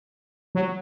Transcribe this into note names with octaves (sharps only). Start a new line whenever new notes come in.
F#3